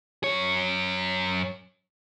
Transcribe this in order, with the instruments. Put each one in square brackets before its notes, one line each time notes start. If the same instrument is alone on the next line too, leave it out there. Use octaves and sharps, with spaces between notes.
[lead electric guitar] F#2 C#5